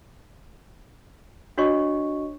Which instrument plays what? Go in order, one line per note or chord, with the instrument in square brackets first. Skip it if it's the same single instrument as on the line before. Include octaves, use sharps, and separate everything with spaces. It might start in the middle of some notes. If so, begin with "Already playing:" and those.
[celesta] D4 F#4 C#5 D#5 C#6